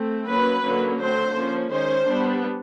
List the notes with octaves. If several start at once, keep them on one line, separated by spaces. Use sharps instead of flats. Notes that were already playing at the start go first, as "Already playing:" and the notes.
Already playing: A3 C4
F#3 A#3 C#4 B4
D3 F#3 A#3 C#4
D3 F#3 A3 C4 C5
F3 A#3 C#4
D#3 G#3 C#4 C5
G3 B3 D4